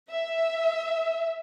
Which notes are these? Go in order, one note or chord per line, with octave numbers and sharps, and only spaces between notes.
E5